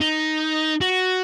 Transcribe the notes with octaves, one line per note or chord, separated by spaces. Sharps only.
D#4
F#4